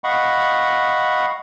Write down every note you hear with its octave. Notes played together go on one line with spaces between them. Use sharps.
D#5 F5 F#5 B5 C#6